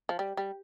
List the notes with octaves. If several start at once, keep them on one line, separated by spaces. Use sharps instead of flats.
F3
G3
G3